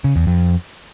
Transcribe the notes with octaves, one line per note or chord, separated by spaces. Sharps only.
C#3
E2
F2